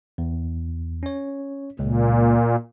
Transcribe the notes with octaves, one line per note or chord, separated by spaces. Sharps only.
E2
C#4 C#5
C#2 A#2